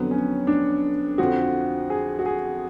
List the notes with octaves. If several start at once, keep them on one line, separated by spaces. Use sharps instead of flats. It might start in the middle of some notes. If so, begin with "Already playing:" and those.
Already playing: F2 D3 F#3 B3
C#4
D4
F2 D3 F3 F#4
G#4
F#4
G#4